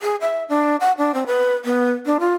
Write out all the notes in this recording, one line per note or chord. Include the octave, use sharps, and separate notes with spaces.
G#4
E5
D4
F#5
D4
C4
B4
B3
D4
F4